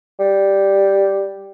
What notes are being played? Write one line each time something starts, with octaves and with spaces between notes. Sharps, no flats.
G3